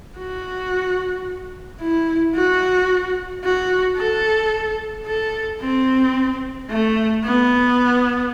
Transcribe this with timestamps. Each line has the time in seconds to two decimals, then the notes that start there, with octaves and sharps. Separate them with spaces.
0.18 F#4
1.80 E4
2.35 F#4
3.44 F#4
3.98 A4
5.07 A4
5.61 C4
6.69 A3
7.24 B3